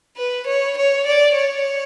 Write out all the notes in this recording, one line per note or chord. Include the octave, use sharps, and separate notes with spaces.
B4
C#5
C#5
D5
C#5